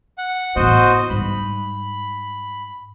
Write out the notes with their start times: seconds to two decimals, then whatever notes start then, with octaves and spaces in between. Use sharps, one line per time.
0.18 F#5
0.56 A2 B3 F#4 C5 D#5
1.10 G#2 G3 B5